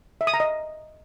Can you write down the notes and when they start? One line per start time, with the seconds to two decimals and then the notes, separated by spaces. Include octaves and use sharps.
0.21 E5
0.27 D#6
0.34 A#5
0.40 D#5